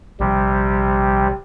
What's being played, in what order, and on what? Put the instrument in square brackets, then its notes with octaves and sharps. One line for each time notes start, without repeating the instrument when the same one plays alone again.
[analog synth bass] A#1 [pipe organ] C3 G3